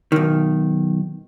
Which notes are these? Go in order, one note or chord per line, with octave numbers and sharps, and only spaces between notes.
B1 D#3